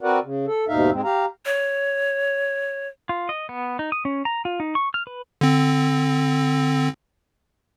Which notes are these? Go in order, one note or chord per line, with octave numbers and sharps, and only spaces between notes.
C4 F#4 A#4 B4 D5 F#5
C#3
A4
D#2 G#2 B2 D#4 E5 F5
G#2 G#3 C4
G4 F5 A#5
C#5
F4
D#5
B3
D#4
D#6
C#4
A#5
F4
D#4
C#6
F6
B4
D3 C4